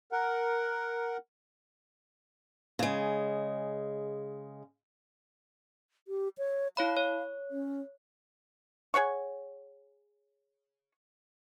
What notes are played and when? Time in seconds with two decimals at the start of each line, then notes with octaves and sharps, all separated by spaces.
0.12 A#4 F#5
2.79 C#3 G#3
6.08 G4
6.38 C#5
6.77 E4 C#5 F5 B5
6.97 C#5
7.51 C#4
8.94 G#4 C#5 F#5 C#6